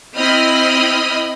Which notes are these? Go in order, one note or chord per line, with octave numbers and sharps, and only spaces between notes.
C4 E4 D#5 B5 D#6 F6